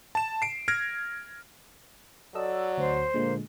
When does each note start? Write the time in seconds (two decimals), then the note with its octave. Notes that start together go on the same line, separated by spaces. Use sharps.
0.15 A5 E7
0.42 C7 D7
0.68 F6 G#6 A#6 D7
2.35 F#3 A4 D5 D#5 E6
2.77 D2 C5
3.14 A#2 D3 G#3 A#3